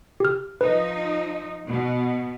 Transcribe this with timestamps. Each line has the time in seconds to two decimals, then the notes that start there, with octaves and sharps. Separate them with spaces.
0.20 G4 F6
0.61 F3 D#4 B4
1.66 B2